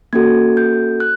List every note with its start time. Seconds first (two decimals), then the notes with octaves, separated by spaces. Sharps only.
0.13 A#3 C#4 F#4 A4 G#6
0.57 G6
1.00 F#6